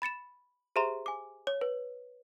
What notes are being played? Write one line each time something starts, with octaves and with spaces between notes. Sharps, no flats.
B5 A6 C#7 E7
G4 G#4 C5 E5 A#5 C6
G#5 D6
C#5
B4